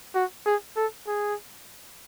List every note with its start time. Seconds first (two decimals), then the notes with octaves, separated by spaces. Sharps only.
0.15 F#4
0.46 G#4
0.77 A4
1.07 G#4